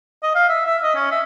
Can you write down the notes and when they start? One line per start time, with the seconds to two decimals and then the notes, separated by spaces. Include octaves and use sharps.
0.23 D#5
0.35 F5
0.49 E5
0.66 E5
0.83 D#5
0.96 C#4
1.11 E5